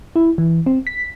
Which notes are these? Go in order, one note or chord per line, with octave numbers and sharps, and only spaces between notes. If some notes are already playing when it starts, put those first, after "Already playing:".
E4
E3
C4
B6